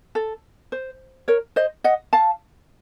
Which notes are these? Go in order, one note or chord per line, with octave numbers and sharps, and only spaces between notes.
A4
C5
A#4 C#5
C5 D#5
D#5 F#5
F5 A5